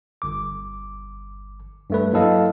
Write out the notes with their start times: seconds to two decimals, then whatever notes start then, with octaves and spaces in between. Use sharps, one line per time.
0.22 G1 D6
1.90 G2 A3 B4
2.13 F#3 A#3 E4 A4 D#5 F5